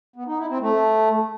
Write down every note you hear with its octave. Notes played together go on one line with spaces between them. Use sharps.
B3
D#4
E4
C4
A3